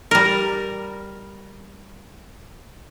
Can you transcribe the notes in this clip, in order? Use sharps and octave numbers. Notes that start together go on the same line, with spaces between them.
G3 A#4